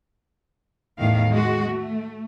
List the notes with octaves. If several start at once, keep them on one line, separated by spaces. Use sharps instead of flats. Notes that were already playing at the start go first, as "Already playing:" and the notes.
E2 A2 D#3 F5
G#3 F#4
A3